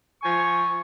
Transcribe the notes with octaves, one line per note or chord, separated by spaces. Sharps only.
F3 G#5 C#6